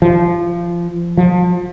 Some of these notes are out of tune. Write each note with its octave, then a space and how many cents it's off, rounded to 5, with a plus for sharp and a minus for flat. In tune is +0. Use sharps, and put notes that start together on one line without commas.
F3 -20
F3 +30